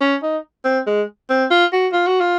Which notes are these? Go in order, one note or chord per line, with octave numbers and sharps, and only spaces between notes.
C#4
D#4
C4
G#3
C4
F4
F#4
F4
F#4
F4